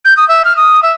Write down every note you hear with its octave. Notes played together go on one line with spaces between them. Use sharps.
G6
D#6
E5
F6
D#6
E5